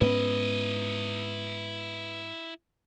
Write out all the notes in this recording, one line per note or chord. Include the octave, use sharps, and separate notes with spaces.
G#2 B3 C#4 E4 B4 D#5